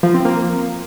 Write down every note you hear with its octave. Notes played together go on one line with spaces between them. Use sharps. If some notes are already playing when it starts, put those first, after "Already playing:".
F3
C4
A#3